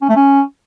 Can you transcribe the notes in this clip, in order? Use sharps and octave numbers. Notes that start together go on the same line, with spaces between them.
C#4
A3
C#4